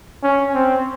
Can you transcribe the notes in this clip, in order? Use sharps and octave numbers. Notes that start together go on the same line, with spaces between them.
C#4
C4